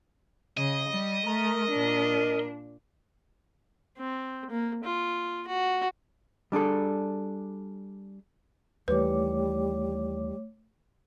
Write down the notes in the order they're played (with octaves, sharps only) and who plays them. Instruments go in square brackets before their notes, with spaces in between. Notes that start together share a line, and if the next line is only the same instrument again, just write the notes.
[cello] C#3 [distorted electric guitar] D#5
[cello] G3
[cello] A3 [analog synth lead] A#4
[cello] A#2 D4
[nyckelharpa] C4
A#3
F4
F#4
[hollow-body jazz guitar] G3 D4 G#4 A4
[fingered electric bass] D#2 E3 [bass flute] G3 [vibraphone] A3 C#5 D6 [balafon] B4